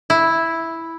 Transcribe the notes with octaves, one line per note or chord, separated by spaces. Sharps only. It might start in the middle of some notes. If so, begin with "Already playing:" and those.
E4